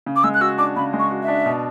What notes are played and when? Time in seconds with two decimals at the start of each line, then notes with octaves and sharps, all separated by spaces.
0.06 C#3
0.16 D6
0.23 G#3 E6
0.34 F#6
0.41 F#4 E6
0.58 D4 D6
0.76 C#3 B5
0.93 G#3
0.99 C#6
1.11 F#4
1.23 E5
1.28 D4
1.46 B2